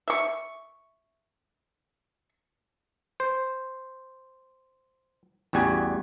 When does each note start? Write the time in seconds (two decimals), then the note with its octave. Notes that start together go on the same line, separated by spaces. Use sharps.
0.08 E5 C#6
3.20 C5
5.53 A1 E2 G3 F#4 G#5